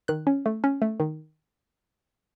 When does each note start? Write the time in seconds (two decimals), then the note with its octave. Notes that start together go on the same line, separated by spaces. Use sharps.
0.08 D#3 F#6
0.27 C#4
0.46 A3
0.64 C#4
0.82 A3
1.00 D#3